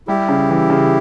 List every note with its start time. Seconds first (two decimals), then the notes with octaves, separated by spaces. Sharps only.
0.08 G3 E4 G4
0.28 C#3
0.50 E3
0.70 C#3